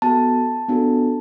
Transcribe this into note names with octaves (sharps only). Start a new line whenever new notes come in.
B3 F#4 A4 A5
B3 D4 F#4 A4